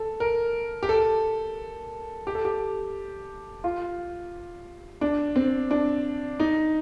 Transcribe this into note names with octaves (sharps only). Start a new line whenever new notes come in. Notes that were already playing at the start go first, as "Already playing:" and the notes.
Already playing: A4
A#4
G4
A4
G4
A4
G4
F4
D4
C4
D4
D#4